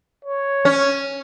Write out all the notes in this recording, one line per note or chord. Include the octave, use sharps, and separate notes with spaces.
C#5
C#4